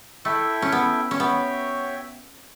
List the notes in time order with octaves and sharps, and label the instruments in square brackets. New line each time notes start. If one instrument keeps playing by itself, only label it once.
[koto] A3 [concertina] E4 A4 E5 G5
[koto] C#4
B3
C#4
[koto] B3 [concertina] F#4 C#5 E5 G5